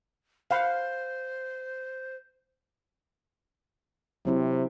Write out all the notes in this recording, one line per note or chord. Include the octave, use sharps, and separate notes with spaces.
C5 F5 F#5 B5
C3 F#3 C4 E4